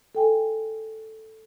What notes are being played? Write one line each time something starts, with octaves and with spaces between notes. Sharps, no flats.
A4 G5 G#5